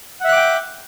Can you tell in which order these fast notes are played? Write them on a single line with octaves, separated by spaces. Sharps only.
F#5 E5 F#6 D6 G5